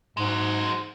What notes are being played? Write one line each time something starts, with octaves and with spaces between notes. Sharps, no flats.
G#2 F#3 G#3